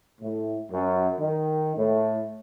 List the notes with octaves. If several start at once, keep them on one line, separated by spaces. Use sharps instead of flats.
A2
F#2
D#3
A2